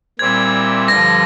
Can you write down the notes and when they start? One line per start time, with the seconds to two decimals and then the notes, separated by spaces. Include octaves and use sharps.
0.19 A#2 G3 C4 E4 G#6
0.88 G2 D3 F3 A#6